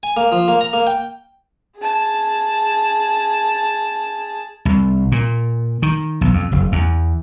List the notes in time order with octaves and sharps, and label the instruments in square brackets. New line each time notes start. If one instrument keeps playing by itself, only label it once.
[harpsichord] G#5
A#3
F3
A#3
A#5
A#3
G5
[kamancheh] G#4 A5
[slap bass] C2
A#2
D#3
B1
F2
F#1
E2